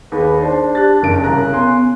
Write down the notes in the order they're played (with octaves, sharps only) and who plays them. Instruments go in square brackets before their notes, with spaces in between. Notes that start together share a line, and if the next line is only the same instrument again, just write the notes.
[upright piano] D#2 [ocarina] G#4 [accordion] B4
[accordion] D4 [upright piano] C5 [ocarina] D5
[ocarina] G4 [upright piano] F#6 A6
[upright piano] F#1 C#3 D7 [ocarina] A#4
[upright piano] C2 A#5 [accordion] C#3 F#6
[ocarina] B3 [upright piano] G#5 C6